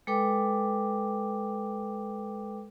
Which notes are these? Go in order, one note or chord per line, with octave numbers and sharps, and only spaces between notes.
G#3 A4 B4 G5 D6